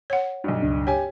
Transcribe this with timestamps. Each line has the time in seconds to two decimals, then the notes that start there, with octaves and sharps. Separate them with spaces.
0.10 C#5 F#5
0.44 B1 G2
0.62 C#2 D4
0.87 G4 C#5 G#5